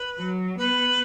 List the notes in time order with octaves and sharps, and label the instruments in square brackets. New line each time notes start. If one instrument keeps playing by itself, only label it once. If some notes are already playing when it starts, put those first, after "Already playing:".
Already playing: [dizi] B4
[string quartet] F#3
[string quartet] B3 [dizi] B4